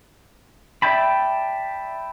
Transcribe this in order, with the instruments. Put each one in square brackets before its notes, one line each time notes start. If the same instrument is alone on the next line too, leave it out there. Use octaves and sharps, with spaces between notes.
[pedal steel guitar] D5 E5 G5 A5 B5